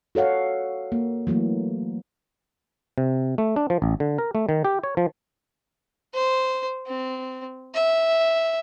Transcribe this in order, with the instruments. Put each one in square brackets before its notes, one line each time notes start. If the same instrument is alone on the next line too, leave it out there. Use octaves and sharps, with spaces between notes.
[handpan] F#4 A4 C#5 F5 F#5
A#3
E3 F#3 A3 A#3
[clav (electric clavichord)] C3
A3
D4
F3
A1
D3
A#4
A3
D#3
G4
C#5
F3
[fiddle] C5
C4
E5